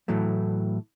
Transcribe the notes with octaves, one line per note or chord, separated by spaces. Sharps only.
A2 E3 F#3 A3